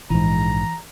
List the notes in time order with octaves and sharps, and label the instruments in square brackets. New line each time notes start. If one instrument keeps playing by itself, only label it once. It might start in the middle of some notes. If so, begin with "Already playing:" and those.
[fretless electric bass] A#1 G#2 [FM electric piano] E3 [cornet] A#5